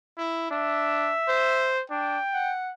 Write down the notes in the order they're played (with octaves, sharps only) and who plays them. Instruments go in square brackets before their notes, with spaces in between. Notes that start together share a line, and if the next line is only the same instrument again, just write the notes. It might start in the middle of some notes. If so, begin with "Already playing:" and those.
[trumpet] E4
[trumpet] D4 [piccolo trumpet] E5
[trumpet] C5
[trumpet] D4 [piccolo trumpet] G5
[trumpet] F#5